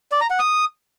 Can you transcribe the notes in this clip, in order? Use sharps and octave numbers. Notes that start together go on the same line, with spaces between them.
D5
A#5
F#5
D#6